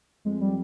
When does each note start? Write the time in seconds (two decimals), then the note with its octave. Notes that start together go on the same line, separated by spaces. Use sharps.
0.25 F2 G#3
0.41 G3